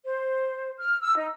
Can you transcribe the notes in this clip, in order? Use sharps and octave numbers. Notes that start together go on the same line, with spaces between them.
C5
F6
E6
D#4